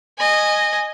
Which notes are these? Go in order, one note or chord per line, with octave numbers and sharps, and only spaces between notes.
D#5 G#5